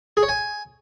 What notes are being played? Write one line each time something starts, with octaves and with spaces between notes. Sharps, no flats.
G#4
C#5
G#5